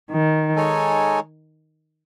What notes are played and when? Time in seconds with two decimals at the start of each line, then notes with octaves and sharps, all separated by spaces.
0.10 D#3
0.56 G#3 D#4 A4 C#5 G#5